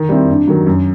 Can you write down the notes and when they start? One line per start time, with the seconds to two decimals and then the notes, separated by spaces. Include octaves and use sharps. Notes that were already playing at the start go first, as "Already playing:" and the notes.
Already playing: D#3
0.09 G3 C4 E4
0.29 G2
0.48 D#3 F#3
0.67 F#2